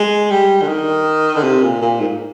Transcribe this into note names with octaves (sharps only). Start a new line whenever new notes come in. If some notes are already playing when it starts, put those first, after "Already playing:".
Already playing: G#3
G3
D3
D#3
D3
C3
A#2
A#2
G#2